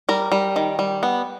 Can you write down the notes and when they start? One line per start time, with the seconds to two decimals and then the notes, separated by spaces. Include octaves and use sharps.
0.09 G3 A#4
0.32 G3
0.56 D#3
0.79 G3
1.03 B3